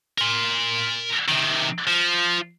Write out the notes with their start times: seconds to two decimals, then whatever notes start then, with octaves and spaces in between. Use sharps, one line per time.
0.18 A#4 C6
1.28 C3 D#3
1.88 F3